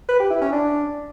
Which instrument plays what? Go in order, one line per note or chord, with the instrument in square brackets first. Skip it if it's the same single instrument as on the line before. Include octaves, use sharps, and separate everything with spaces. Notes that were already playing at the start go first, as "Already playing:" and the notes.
[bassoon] B4
G4
E4
C#4
D4